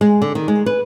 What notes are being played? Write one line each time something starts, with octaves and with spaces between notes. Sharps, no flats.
G#3
D3
D#3
G#3
B4